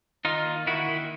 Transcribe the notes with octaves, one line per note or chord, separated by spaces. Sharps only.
D#3 D#4 F4
A#3
D#3 E4 F#4
D#3